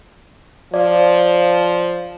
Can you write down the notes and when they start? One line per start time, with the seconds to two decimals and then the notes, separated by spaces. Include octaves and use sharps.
0.74 F3 D5 F5